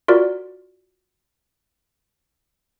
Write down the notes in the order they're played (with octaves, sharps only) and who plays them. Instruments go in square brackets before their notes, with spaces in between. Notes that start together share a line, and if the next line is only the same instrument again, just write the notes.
[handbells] F4 F#4 A#4 D5